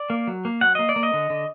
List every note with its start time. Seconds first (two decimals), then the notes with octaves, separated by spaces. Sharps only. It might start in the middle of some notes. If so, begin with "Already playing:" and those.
Already playing: D5
0.10 A#3
0.27 F#3
0.45 A#3
0.61 F#3 F#5
0.75 A#3 D#5
0.89 D5
0.96 A#3
1.03 D#5
1.13 D3
1.30 D3